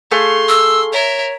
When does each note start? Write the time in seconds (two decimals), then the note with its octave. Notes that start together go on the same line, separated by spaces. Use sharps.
0.11 A3 G#4 F5 C6
0.49 E6
0.93 A#4 C#5 E5